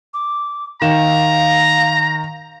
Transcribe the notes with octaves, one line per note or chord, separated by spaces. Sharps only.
D6
D#3 F5 A#5 E7